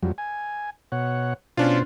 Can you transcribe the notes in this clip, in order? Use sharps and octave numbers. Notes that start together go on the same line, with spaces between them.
F2 F#3 G3
G#5
B2 C#5 F#5
B2 C#4 D4 F4 C5